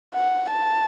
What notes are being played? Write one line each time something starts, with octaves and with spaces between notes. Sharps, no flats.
F#5
A5